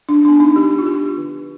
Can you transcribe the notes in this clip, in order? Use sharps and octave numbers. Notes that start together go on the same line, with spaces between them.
D4
B3 D4
D#4
F3 G4
F4
B3 D4 G4
D3